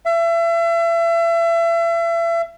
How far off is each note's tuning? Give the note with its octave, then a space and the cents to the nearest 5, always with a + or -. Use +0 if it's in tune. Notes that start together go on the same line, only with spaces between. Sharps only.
E5 +35